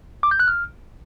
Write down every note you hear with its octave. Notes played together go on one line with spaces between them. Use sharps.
D6
G6
F#6
F6